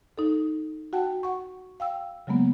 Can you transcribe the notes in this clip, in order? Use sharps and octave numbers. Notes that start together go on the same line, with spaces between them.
D#4 A4
F#4 F#5 G5 A5
F#5 C#6
F5 G5 E6
C#3 F#3 G#3 A#3 B3